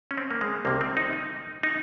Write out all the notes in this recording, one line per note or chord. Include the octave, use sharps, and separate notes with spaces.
C#4
C4
A#3
G#3
C2 C3 D#3 A#3
C4
D#4
D#4
D#4